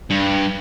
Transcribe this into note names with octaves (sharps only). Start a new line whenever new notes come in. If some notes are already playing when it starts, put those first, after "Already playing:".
G2